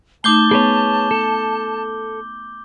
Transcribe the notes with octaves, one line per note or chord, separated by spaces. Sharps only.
A3 D#4 A5 D6 G6 G7
B3 G#4 B4 C#5
A4